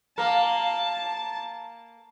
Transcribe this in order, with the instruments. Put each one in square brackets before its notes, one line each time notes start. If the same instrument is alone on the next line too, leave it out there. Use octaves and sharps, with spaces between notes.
[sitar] A#3 A#4 [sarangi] A5